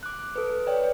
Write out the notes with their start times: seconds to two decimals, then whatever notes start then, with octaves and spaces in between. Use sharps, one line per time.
0.03 D6 F#6
0.36 A4 B4
0.66 B4 C#5 D5 G5